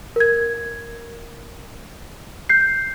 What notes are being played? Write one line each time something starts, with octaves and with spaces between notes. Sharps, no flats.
A#4 G#6
G6 C7